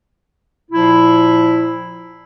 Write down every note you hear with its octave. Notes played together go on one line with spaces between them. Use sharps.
A#2 F3 E4